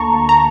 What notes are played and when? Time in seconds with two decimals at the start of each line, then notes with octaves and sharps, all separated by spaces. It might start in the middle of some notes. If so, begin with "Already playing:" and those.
Already playing: D2 D3 A#3 A5 A#5 C#6
0.29 A#5